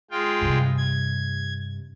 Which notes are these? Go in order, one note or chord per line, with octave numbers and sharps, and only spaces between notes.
G#3 F4 G5
G2 C3
G#6